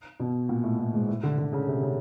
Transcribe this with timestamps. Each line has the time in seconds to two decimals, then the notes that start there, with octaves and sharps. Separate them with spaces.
0.20 B2
0.49 A#2
0.63 A2
0.79 A2
0.94 G#2
1.08 A2
1.23 D3
1.38 D3
1.53 C#3
1.68 C3
1.83 C#3